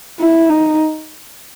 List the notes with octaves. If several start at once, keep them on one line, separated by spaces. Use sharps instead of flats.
E4
D#4